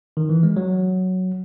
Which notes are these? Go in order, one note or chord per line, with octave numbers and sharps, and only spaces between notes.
D#3
E3
G#3
F#3